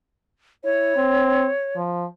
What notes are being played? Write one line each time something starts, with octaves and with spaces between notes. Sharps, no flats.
E4 C#5
C4
F3